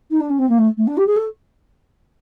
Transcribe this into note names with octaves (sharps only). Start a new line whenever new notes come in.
D#4
D4
C#4
C4
A#3
A3
A3
D4
G4
G#4
A4